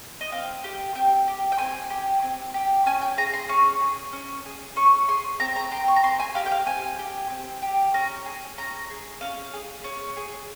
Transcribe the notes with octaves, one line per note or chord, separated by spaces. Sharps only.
D#5
C4 F5
G4
C4 G5
G4
G5
C4 G#5
G4
C4
G4
C#4 G#5
G5
G#4 A#5
C6
C#4 C#6
G#4
C#4
G#4
C#4 C#6
G#4 C6
C4 A#5
A#5
G4 C6
C#6
A#5
C4 C6
G#5
G4 F5
G5
F5
C4 G#5
G4
C4
G4
C#4 A#5
G#4
C#4 A#5
G#4
C#4 F5
G#4
C#4
G#4